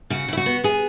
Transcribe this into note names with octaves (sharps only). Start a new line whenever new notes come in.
C#3 F#4
C#3 E4
F#4
B3
B3 G#4